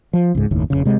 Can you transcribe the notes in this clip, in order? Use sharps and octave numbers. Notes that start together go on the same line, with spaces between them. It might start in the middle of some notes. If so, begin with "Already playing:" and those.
F3
C#2 G#2
F#1 D#2 A2
F1 A#1 C#3
C3 G#3